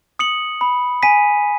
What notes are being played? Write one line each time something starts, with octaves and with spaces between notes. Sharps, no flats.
D#6 C#7 F#7
B5
G#5 B6 D#7